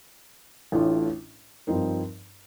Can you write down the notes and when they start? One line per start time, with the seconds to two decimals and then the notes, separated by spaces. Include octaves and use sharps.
0.72 A1 A2 A3 D4 F4
1.67 G2 F3 C4 D#4 A#4